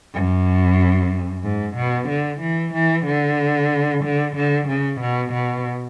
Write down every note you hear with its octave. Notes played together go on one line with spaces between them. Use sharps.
F#2
G#2
B2
D3
E3
E3
D3
D3
D3
C#3
B2
B2